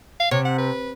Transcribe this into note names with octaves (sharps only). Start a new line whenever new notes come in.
F5
C3 C#5
F#5
B4